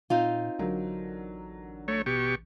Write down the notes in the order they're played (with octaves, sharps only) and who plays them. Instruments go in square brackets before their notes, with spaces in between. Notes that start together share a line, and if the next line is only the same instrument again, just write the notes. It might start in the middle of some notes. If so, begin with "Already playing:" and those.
[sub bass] A#2 [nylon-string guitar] C4 D#4 F4
[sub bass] A1 [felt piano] D3 F#3 A#4
[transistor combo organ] A3 C#5
B2 G4 C#6